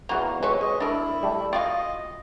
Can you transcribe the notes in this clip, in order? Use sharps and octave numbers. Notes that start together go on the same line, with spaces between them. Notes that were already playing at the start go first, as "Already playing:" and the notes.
E2 A#3 F4 F#4 A#5
G#3 C4 F#4 B4 C#5
G#3 D#5
D4 E4 A#4
G3 A3
F4 F#4 D#5 F5 G5